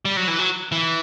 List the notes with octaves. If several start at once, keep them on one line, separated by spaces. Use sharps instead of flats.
G3
F#3
E3
F#3
E3